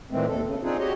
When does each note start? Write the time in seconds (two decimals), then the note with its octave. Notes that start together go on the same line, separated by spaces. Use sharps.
0.11 A#2 D#3 E3 G#3 A3 C4
0.28 D#2 A4
0.43 C#3
0.63 C4 D4 D#4 F4 G#4
0.79 F#4 G4 C#5 D#5